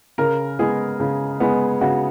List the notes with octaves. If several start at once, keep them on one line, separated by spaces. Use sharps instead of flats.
C#3 A#4
G#3 B3 G#4
C#3
G#3 B3
C#3 F#4